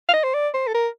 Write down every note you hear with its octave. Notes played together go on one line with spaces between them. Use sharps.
F5
D#5
C5
D5
C5
A4
A#4